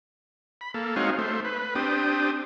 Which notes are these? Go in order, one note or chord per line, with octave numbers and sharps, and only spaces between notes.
B5
A#3 A4
G#3 C4 D#4 F#4 C#5 F5
A3 C5
B4
C4 D4 G4 D#6